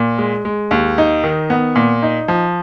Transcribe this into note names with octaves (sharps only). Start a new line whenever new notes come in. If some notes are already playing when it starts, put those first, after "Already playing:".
Already playing: A#2
G#3
G#3
D#2
D#4
D#3
B3
A#2
D#4
F3